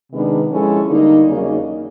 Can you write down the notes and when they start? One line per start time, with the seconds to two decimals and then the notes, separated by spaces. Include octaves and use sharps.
0.12 C3 D#3 G#3 B3 D4
0.50 F3 G#3 C#4 E4 A4
0.88 D3 G3 A#3 D#4
1.27 E2 C#3 F#3 A#3 D#4